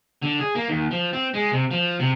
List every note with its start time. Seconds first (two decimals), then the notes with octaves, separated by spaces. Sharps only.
0.22 D3
0.40 G#4
0.55 A#3
0.69 D#2
0.91 F3
1.13 C4
1.34 G#3
1.51 C3
1.71 F3
1.99 C3